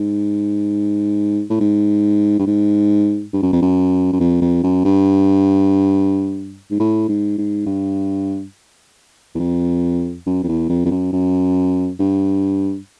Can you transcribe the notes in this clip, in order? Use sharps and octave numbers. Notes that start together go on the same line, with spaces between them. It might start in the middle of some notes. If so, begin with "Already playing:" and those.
Already playing: G#2
A2
G#2
G2
G#2
G2
F#2
F2
F#2
F#2
F2
F2
F#2
G2
G#2
A2
G#2
G#2
G2
E2
F2
F#2
F2
E2
F2
F2
F#2
F#2
G2